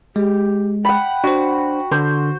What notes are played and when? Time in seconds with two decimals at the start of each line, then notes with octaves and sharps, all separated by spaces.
0.16 G#3 G4
0.85 F#5 G5 B5
1.24 D4 F#4 C5
1.92 D3 D4 C5